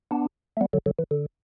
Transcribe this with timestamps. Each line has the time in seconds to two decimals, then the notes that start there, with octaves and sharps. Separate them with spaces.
0.11 B3 D4
0.57 A3
0.61 G3 B3
0.73 D3 F#3
0.86 D3 F#3
0.99 E3
1.11 D3